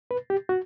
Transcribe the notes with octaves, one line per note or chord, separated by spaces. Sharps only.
B4
G4
F#4